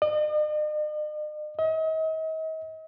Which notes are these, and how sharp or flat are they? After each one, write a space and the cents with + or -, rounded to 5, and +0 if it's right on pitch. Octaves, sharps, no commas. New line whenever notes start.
D#5 -45
D#5 +40